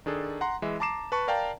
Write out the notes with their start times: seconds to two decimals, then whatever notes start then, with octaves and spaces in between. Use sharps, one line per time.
0.06 D#3 D4 G#4 A4
0.41 F#5 A#5 C6
0.62 E3 G#3 E5
0.80 A5 A#5 D6 C7 E7
1.12 B4 A5 C#6
1.28 A#4 D5 F5 G5 A5 A#5